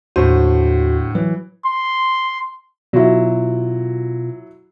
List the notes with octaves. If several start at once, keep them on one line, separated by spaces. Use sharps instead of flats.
D#2 A2 D3 F#4 C5
E3 F#3
C6
B2 F#3 E4 F4